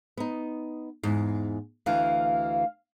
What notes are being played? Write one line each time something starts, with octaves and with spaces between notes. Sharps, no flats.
B3 D#4
E2 G#2
D2 E3 F5